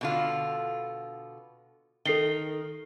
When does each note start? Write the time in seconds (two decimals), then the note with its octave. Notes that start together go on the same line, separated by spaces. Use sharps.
0.01 B2 D3 F4
2.05 D#3 A4 C7 G7